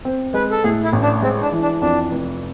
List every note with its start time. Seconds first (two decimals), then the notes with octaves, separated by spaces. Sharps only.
0.05 C4
0.34 G#3 B4
0.51 A4
0.64 A2 G#4
0.84 E4
0.93 A1
1.03 D4
1.22 G#3 C4
1.42 D4
1.52 E3
1.62 D4
1.81 F2 D4
2.11 F1